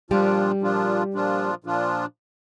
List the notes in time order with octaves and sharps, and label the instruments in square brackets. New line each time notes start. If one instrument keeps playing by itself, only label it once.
[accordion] A#2 F3 D4 F4 [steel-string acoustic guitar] G3 G4
[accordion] A#2 F3 D4 F4
A#2 F3 D4 F4
A#2 F3 D4 F4